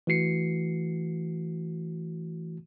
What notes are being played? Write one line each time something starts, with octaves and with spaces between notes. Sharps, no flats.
E3 A3 F#4 C7 C#7